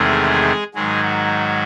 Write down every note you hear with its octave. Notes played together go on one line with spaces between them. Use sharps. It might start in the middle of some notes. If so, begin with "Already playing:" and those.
Already playing: E2 C3 D#3 G#3 A3 G#4
G#2 D#3 F#3 G#3 G#4
F#4